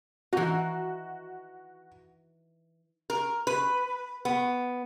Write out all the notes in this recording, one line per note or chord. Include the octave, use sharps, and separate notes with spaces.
E3 D#4 F#4
A#4
B4
B3